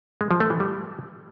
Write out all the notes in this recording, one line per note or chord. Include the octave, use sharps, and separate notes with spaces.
G#3
F3
A3
E3
G3